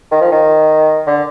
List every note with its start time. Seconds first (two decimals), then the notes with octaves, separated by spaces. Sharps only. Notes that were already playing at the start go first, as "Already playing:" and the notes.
0.12 D#3
0.21 F3
0.32 D#3
1.07 D3